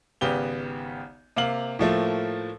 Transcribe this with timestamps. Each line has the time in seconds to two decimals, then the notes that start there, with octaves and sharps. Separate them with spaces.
0.21 G#1 C#3 B3 G4 G7
1.36 C3 A#3 F5 F#7
1.79 A2 F3 A3 A#3